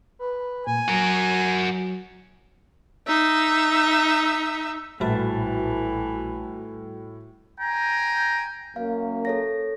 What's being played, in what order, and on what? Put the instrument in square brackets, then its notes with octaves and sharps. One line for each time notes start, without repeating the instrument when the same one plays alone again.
[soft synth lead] B4
[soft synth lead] A#2 [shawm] G#5
[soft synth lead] F#3 [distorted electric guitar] F#4 A#4
[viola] D#4 E5
[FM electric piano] A#1 B4 A5 [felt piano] A2 [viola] E3 [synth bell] G3 F#4
[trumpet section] G5 G#5 A#5
[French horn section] F#2 A#3 [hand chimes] F5
[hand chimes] A4 C#5 A#6